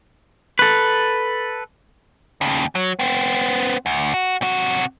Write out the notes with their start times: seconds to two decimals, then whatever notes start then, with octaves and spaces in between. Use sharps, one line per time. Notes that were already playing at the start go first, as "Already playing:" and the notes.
0.59 A4 B4
2.41 D#2 C#3
2.75 F#3
2.99 B3 C4
3.86 D2
4.14 F#4
4.42 C3 F#4